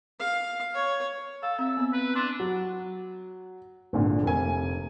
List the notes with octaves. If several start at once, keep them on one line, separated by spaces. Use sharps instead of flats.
F5
C#5
A4 F5
C4 E5
B3 C4
C4 B4
D4 C6
F#3
G#1 A#2 D3
F1 A#3 G#5